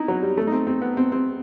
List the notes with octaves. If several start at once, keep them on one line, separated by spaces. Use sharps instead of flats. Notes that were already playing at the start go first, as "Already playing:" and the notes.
Already playing: D#4 E4
F#3
G3
A3
D#4
C4
C4
B3
C4
C4